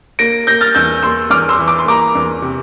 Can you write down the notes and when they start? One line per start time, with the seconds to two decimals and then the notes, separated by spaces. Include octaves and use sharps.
0.19 A#3 A#6 D7
0.47 A#3 G6 A#6
0.61 F6 A6
0.75 E2 E6 G6
1.03 A#3 C6 E6
1.30 E2 D6 F6
1.49 C6 E6
1.59 E3
1.68 D6
1.79 C6
1.86 A#3 A#5 D6
2.15 E2
2.42 C3